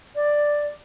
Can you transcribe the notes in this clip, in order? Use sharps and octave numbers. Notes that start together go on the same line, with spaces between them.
D5